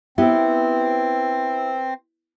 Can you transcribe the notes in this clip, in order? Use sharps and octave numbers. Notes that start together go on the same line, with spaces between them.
B3 C4 E4 G4